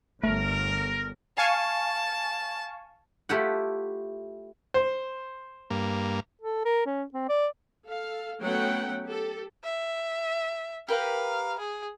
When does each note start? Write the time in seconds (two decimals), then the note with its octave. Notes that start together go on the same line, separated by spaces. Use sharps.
0.23 G1 A3 A#4
1.37 F5 G#5 A5 C#6
3.29 A3 E4 F4 G4 B4 F#5
4.74 C5
5.70 G2 A#3
6.42 A4
6.65 A#4
6.86 C#4
7.14 C4
7.29 D5
7.85 A4 F5
8.42 F#3 A3 B3 C#4 F#5 G5
9.05 G4 A4
9.64 E5
10.89 G4 A#4 B4 F5
11.59 G#4